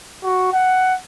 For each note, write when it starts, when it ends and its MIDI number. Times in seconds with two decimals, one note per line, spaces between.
0.23 0.52 66
0.52 0.95 78